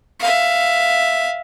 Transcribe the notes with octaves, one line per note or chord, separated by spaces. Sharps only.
E5 F5